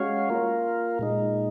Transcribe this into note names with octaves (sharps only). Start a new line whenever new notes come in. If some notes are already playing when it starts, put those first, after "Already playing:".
Already playing: G#3 C#4 F#4 C#5 F5
A#3 F4 A#4
A#2 G#3 D#4